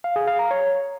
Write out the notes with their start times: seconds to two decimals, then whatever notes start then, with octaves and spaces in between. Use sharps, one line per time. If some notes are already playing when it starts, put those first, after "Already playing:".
0.04 F5
0.16 G#4
0.27 F5
0.39 A#5
0.51 C#5